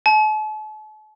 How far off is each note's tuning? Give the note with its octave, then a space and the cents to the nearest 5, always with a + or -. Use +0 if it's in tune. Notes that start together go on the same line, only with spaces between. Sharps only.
A5 -45